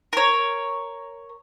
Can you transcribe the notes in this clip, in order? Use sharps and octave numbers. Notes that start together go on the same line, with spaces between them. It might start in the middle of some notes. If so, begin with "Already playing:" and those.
A#4 C#5